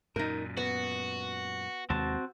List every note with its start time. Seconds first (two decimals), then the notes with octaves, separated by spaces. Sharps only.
0.16 F#2 A#2 D#4 A#4
0.57 B3 F#4
1.90 D#2 C3 G#3 C4 F#4 A5